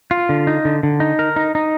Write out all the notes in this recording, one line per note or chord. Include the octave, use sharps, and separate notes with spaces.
F4
D3
D#4
D3
D3
D#4
A#4
D#4
D#4